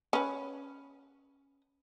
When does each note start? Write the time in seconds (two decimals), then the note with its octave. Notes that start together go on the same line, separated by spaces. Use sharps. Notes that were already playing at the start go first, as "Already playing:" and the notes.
0.13 C#4 B4